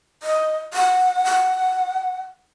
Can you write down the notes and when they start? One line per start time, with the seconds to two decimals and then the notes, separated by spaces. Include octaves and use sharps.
0.23 D#5
0.74 F#5
1.25 F#5